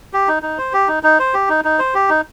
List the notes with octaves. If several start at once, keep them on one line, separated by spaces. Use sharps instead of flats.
G4
D#4
D#4
C5
G4
D#4
D#4
C5
G4
D#4
D#4
C5
G4
D#4